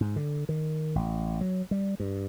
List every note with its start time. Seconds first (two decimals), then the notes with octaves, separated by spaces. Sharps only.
0.01 G#2
0.16 D3
0.49 D#3
0.95 A1
1.41 F#3
1.71 G3
2.00 G2